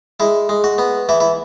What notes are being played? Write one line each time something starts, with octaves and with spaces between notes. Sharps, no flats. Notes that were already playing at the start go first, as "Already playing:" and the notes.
G#3 E4
G#3
F#4
B3
E3 E4
E4